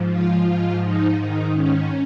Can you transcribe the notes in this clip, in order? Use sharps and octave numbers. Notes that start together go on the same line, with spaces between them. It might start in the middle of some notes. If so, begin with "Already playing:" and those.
Already playing: G#2 F3
F4
G#2 F3
D#4
G#2 D#3 D#4
C#4